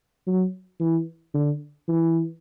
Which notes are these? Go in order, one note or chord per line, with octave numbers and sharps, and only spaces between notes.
F#3
E3
D3
E3